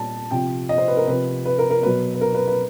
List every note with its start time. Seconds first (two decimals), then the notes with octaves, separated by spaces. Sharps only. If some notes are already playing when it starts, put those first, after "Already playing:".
Already playing: A#2 G3 A5
0.31 C3 F3 G5
0.69 D#5
0.78 C5
0.88 B4
0.97 A#4
1.07 C3 F3 B4
1.45 B4
1.58 A#4
1.70 A#4
1.83 B2 F#3 B4
2.14 B4
2.21 A#4
2.35 B4
2.48 B4